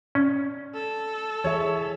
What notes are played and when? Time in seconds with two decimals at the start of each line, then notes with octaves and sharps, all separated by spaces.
0.15 C#4 D5
0.75 A4
1.44 E3 G#4 C#5 E5